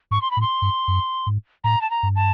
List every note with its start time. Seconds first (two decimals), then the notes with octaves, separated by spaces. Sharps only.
0.11 G#2 C#6
0.22 C6
0.31 B5
0.37 A2
0.41 C6
0.62 G2
0.88 F#2
1.27 G#2
1.64 A2 A#5
1.81 A5
1.91 A#5
2.03 G2
2.16 A5